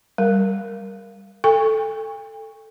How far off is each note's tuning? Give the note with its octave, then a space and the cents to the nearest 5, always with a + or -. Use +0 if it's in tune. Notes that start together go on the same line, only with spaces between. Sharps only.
G3 +0 A#4 +0
A4 +0 G5 +40 C#6 -10